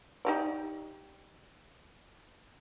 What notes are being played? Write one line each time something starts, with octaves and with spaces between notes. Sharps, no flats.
D#4 G4 D5